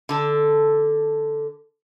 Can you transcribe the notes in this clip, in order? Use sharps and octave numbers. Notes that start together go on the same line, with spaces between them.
D3 A4